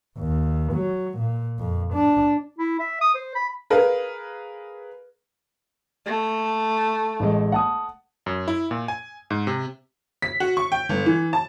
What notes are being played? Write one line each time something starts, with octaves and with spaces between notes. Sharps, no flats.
D#2
F#3
A#2
F2
D4
E4
E5
D#6
C5
B5
G#4 A#4 B4 F5
A3
A1 G#3
F#5 A5 D#6
F#2
E4
A#2
G#5
G#2
C3
B6
F#4
C#6
G5
G1
E3
A5